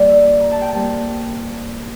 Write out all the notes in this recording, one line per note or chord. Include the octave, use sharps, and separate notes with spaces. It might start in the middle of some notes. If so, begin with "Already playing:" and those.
Already playing: C3 G3 A#3 D5
E5
A#5
A5
G5
C3 G3 A#3 A5